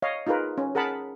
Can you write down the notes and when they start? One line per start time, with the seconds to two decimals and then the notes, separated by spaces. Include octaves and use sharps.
0.02 C#5 D#5 F5
0.27 D#4 F4 G#4 A#4 B4
0.58 C#4
0.75 G#4 A#4 F#5 A5 B5